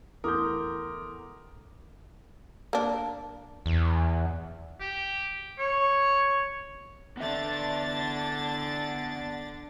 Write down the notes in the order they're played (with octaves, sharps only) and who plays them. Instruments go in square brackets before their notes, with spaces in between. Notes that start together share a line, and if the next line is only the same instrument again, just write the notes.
[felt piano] E2 A3 G6 [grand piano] A#4 [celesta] C6 D6 D#6
[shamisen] A#3 D4
[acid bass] E2
[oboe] G4
C#5
[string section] D3 D4 A6 [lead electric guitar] B3 E5